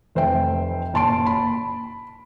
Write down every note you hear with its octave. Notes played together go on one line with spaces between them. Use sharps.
F1 C5 E5 G5
F#1 A#2 A5 C6 D7
B5